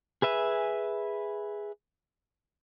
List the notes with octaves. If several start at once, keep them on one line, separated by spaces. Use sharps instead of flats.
G#4 B4 E5 G#5